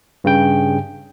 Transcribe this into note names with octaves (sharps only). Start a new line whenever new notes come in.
G2 C#3 G5